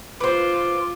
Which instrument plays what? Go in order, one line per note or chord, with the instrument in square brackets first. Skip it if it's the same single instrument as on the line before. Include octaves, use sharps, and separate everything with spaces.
[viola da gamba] F4 [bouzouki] B4 C5 [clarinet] D6